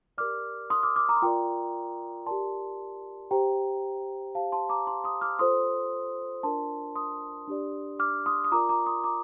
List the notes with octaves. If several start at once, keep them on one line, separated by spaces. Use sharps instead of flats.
G4 A#4 D5 D6 F6
C6 D#6
D6 F6
D6 F6
A#5 D6
C6
F4 A#4 D5 G5 A#5
G4 A#4 D5 A5 C6
G4 C5 G5 A#5
G4 C5 F5 A5
A5 C6
A#5 D6
A5 C6
C6 D#6
D6 F6
F4 A4 C5 C6 D#6
D4 F4 A#4 D5 A5 C6
C6 D#6
D4 G4 D5
D6 F6
C6 D#6
D#6
F4 A#4 D5 A#5 D6
A#5 D6
C6 D#6
A#5 D6